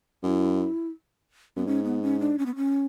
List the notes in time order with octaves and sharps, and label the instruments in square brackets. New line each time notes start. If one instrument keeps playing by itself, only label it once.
[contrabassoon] F#2 [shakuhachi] E4
[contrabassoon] F#2 [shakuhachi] B3
[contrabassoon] G#2 [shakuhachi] C#4
[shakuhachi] B3
C#4
D4
C#4
B3
C#4